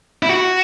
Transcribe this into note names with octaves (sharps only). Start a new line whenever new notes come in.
E4
F#4